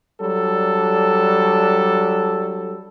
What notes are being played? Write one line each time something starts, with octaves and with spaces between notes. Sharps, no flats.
F#3 G3 D4 A4